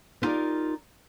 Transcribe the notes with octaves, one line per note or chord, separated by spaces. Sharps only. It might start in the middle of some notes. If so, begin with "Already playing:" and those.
B3 D#4 F4 G4 A#4 D5